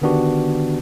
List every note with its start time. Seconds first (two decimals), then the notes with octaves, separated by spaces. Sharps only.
0.02 D3 D#3 B3 D4 F#4 G4